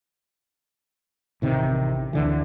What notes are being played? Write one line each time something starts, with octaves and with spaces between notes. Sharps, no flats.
A1 C3 D#3
D2 D3 E3